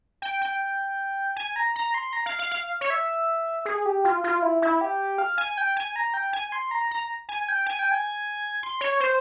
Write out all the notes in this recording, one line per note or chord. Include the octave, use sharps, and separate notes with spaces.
G5
G5
G#5
A#5
A#5
C6
A#5
F5
F5
F5
C#5
E5
G#4
G4
F4
F4
E4
E4
G4
F5
G#5
G5
G#5
A#5
G5
G#5
C6
A#5
A#5
G#5
G5
G#5
G5
G#5
C6
C#5
C5